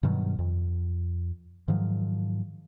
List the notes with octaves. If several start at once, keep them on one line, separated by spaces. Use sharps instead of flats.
G2 B2 D#3 F#3
F2
G#2 D#3 F3 F#3